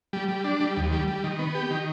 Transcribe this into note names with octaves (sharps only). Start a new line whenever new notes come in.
G3
G3
D4
G3
D#2
G3
G3
D#3
B3
G4
D#3